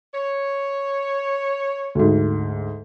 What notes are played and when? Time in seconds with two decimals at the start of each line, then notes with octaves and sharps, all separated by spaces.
0.14 C#5
1.95 D2 G#2